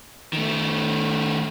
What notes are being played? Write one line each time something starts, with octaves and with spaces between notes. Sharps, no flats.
D#3 A3